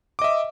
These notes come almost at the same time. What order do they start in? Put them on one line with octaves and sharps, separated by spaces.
D6 D#5 E5